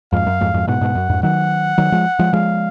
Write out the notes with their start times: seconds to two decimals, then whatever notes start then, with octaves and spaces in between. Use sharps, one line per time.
0.12 F2 G#2 F5
0.27 F#2
0.41 F2 G#2
0.54 F2 G#2
0.67 G#2 B2 F#5
0.81 G#2 B2
0.95 F#2
1.09 F2 G#2
1.23 D#3 F#3 F#5
1.78 D#3 F#3
1.92 F3 G#3
2.19 F3 G#3
2.33 F3 G#3 F5